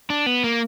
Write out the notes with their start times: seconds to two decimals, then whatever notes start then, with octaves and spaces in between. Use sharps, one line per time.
0.10 D4
0.26 B3
0.44 A#3